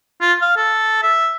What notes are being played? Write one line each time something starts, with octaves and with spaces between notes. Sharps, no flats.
F4
F5
A4
E5